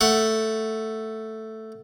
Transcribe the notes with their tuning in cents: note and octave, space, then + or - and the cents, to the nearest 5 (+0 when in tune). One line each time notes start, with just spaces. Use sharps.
A3 +0 F#5 +5